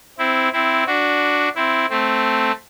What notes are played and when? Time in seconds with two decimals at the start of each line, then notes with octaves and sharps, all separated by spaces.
0.18 C4 E4
0.53 C4 E4
0.87 D4 F#4
1.55 C4 E4
1.90 A3 C4